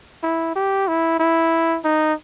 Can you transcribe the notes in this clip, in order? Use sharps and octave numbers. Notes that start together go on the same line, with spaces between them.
E4
G4
E4
E4
D#4